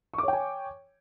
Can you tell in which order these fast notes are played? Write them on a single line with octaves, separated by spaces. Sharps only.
C#6 D6 C#5 G5 G#5